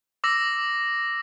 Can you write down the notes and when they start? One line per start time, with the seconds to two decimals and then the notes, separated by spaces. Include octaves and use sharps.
0.24 D6 E6 A#6